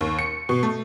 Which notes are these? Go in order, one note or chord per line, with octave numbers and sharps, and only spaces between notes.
D#2
C#7
B2
A3